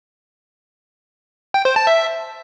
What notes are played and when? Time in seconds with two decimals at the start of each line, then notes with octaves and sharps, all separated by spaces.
1.54 G5
1.65 C5
1.76 A5
1.87 E5